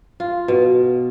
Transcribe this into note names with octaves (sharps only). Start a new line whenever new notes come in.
F4
B2